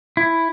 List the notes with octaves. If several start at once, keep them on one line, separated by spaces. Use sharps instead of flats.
E4